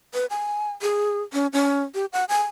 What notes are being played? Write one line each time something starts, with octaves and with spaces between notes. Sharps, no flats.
B4
G#5
G#4
C#4
C#4
G4
F#5
G#5